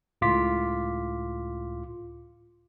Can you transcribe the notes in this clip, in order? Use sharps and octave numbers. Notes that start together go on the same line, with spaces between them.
C#2 A2 F4 D6 B6